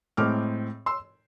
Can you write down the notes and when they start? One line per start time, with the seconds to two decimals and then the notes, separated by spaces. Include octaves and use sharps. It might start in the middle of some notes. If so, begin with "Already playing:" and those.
0.17 A2 G#3 C4 D6 F6
0.86 C6 E6